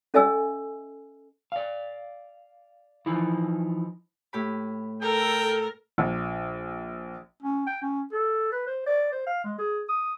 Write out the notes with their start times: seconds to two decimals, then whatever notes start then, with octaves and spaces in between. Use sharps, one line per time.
0.14 C#4 A4 D#5 E5 G#5 E6
1.52 D5 F5
3.06 E3 F3 D#4 E4
4.33 A2 G4 B5
5.02 A4 A#4 G5
5.98 A#1
7.43 C#4
7.66 G5
7.82 C#4
8.12 A4
8.52 B4
8.67 C5
8.87 D5
9.12 C5
9.26 F5
9.44 G#3
9.59 G#4
9.89 D#6